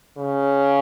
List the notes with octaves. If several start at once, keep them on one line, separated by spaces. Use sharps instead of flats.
C#3